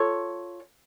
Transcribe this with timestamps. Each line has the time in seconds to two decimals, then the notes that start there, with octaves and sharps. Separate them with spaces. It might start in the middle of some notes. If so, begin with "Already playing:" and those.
Already playing: F4 A4 C#5